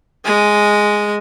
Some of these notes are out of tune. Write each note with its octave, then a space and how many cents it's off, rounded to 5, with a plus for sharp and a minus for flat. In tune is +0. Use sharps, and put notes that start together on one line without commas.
G#3 +0 G#5 +0